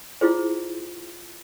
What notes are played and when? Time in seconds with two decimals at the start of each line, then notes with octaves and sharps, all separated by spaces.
0.21 E4 F4 G#4 C5